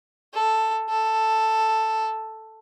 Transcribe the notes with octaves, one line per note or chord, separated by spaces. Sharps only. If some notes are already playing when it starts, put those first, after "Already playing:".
A4
A4